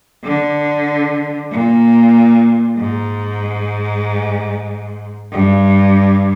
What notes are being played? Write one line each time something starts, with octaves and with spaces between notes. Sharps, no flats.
D3
A#2
G#2
G2